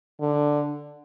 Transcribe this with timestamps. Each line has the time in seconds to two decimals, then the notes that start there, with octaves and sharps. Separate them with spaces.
0.20 D3